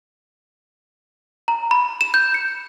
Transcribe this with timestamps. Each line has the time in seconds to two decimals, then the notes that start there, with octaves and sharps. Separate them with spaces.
1.48 A#5
1.71 B5
2.01 E7
2.14 G6
2.34 C#7